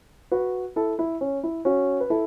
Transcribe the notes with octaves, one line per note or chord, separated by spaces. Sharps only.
F#4 B4
E4 A4
E4
C#4
E4
C#4 F#4
B4
E4 A4